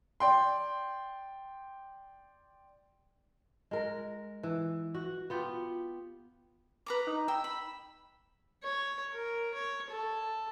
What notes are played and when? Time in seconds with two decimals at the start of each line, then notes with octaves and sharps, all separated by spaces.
0.20 D5 G5 C6
3.71 G#3 A#4
4.43 E3
4.95 F#4
5.30 B3 F4 G4
6.86 B4 A#5 D6
7.07 D#4
7.28 G5 E6
7.44 B5
8.64 C#5
9.13 A#4
9.55 C#5
9.91 A4